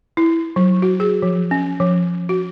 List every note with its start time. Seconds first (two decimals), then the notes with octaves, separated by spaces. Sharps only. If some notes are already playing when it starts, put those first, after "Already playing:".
0.17 E4
0.56 F#3
0.82 F#4
1.00 G#4
1.22 F3
1.51 C#4
1.80 F3
2.29 F#4